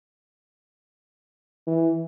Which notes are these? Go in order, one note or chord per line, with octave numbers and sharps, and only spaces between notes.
E3